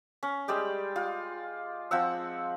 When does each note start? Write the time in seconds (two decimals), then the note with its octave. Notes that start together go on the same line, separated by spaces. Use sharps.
0.23 C#4
0.48 G3 G#3 D5 G5
0.96 F4
1.91 F3 C4 F#5 E6